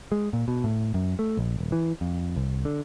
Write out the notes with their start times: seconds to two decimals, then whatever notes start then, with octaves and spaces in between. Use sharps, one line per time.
0.12 G#3
0.33 A#2
0.48 B2
0.64 A2
0.94 F#2
1.19 A3
1.37 A#1
1.58 D#1
1.72 E3
2.01 F2
2.36 C2
2.65 D3